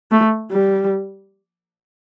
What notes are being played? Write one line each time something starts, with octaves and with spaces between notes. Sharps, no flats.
A3
G3